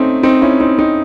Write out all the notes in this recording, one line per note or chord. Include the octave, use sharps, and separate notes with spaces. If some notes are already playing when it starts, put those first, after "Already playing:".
Already playing: A3 C4 C#4 D#4
C4 D#4
C#4 E4
C4 D#4
C4 D#4